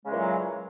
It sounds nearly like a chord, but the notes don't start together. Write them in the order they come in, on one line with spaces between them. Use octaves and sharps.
C#3 G#3 E3 A#2 F#3